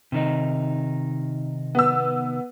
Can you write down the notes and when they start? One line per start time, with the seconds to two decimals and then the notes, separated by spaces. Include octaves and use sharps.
0.12 C3 D#3 D#4
1.75 B3 E6